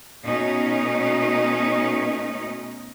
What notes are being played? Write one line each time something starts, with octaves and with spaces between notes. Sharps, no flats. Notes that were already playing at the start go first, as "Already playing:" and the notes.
B2 A3 C#4 D#4